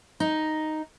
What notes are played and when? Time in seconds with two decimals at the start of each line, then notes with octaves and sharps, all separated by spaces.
0.20 D#4